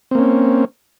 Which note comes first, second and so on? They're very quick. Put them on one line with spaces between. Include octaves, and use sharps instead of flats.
C4 A#3 C#4